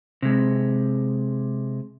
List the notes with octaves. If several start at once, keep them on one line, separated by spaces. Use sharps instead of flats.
C3 G#3